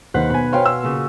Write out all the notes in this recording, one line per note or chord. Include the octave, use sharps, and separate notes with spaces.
D#2 D#3 B4 C5 F#5
B1 G#5 B5
B2 C5 C#5 F5 G5 C6
E6
A#2 C#3